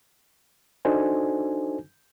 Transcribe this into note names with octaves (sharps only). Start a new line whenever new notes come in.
D4 D#4 F#4 A4 C5 G#5